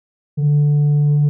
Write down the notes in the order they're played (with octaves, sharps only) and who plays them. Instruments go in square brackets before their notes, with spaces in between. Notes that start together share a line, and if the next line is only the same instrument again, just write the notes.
[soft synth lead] D3